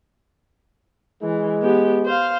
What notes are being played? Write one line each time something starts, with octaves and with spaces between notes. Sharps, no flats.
E3 G#3
B3 G4
C5 F5